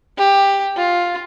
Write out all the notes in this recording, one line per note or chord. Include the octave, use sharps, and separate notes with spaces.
G4
F4